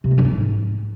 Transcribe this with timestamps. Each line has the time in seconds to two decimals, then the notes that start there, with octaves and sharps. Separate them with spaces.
0.04 C3
0.11 A#3
0.18 F#2
0.25 E3
0.32 G#2